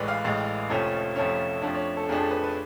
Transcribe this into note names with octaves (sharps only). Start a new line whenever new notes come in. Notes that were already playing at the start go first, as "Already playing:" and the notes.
Already playing: A1 A2 G#3 B4 D5
F5
A1 A2 G#3
F1 F2 F3 A3 C#4
F1 F2 F3 A3 C#4 C#5
F2 F3 A3 D4
C#5
A4
F2 F3 A3 D4 G#4
A4
B4
B4